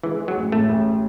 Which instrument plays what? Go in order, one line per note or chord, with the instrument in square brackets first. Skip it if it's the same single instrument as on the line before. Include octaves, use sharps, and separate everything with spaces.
[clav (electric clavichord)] E3 [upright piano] G#3
[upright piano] G#3
[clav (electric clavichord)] F#3
[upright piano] A1
[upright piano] A2 [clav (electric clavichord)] A3
[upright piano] A1